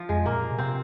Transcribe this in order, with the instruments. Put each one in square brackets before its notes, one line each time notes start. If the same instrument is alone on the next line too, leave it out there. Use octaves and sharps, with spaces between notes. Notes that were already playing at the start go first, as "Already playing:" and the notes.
Already playing: [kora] F3
[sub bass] F2 [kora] G#3
[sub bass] A#2 [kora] A#3
[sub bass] C3
[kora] C4